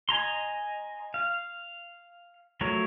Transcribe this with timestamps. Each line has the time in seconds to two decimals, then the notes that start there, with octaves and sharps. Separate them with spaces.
0.09 D#5 G#5 A#5 C6
1.14 F5
2.61 F3 F#3 A3 A#4 C#5